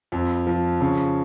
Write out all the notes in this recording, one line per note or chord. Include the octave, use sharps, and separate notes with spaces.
F2
F3
C#3